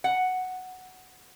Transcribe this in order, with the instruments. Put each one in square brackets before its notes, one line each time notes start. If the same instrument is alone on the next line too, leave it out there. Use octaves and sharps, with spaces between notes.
[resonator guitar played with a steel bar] F#5